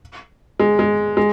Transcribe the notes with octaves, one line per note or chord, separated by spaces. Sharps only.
G#3
G#3
G#3